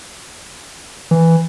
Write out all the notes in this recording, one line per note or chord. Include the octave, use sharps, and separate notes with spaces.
E3